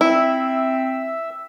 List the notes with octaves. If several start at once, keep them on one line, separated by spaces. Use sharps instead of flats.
C4 E4 E5 E6